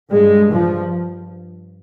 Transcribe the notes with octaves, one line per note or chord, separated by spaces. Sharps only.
G2 G#3
F3